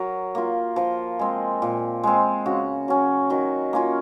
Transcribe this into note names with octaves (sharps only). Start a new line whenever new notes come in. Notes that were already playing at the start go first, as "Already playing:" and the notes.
Already playing: F#3 A#4
A#3 F4
F3 C5
G#3 C4
A#2
G#3 C4
C#3 F#4
F#3 C#4
D#3 F#4
A#3 C#4 F4